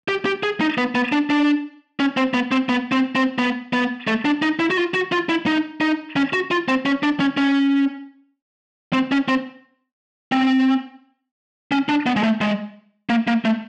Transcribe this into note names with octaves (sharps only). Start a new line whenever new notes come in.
G4
G4
G#4
D#4
B3
B3
D4
D4
C#4
C4
B3
C4
B3
C4
C4
B3
B3
A3
D4
D#4
E4
F#4
F4
F#4
F4
E4
D#4
D#4
C#4
F#4
F4
C4
C#4
D4
C#4
C#4
C4
C#4
C4
C4
C#4
D4
B3
G#3
A3
G#3
A#3
A#3
A3